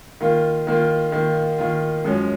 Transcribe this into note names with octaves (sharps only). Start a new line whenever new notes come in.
D#3 A#3 F4
D#3 A#3 F4
D#3 A#3 F4
D#3 A#3 F4
F#2 F3 G#3 C#4